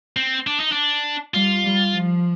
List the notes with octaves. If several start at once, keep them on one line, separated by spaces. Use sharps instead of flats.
C4
D4
D#4
D4
G3 F4
G3
F3